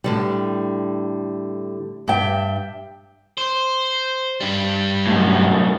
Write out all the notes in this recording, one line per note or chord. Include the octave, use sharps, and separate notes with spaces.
A2 D3 G3
G2 D4 E5 G5
C5
G2 G3
F#2 A2